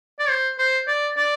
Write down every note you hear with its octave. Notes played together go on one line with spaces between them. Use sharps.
D5
C5
C5
D5
D5